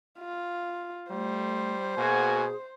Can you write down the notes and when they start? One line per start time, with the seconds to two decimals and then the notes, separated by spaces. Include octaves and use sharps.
0.19 F4
1.10 G3 A3 C5
1.97 B2 A#3 F#4 G#4 G#5